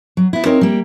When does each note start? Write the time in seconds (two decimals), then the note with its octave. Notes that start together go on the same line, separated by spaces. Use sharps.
0.17 F#3
0.33 B3 E4
0.45 C4 D#4 A#4 C#5
0.61 G3 A#3